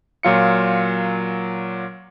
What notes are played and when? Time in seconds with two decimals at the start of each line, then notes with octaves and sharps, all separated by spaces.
0.23 A#2 F#3 F4 C#7